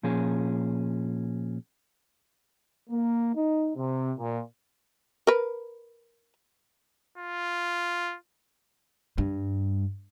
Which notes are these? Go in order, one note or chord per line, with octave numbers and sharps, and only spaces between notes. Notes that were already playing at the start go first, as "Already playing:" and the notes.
A#2 F3 C#4 G#4
A#3
D#4
C3
A#2
A#4 B4
F4
G2